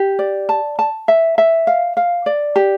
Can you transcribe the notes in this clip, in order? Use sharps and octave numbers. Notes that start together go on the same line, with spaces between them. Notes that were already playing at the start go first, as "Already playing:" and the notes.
Already playing: G4
D5
A5
A5
E5
E5
F5
F5
D5
G4